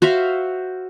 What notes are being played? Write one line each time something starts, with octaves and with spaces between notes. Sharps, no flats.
F#4 C5 E5 F5